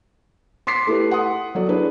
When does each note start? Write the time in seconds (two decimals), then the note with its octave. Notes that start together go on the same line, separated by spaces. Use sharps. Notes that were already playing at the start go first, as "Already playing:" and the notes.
0.67 C6 D6 B6 C7
0.87 A3 E4 G4 B4
1.11 F#5 C6 D#6
1.55 F#3 A4 D5
1.69 D4 E4 G#4 B4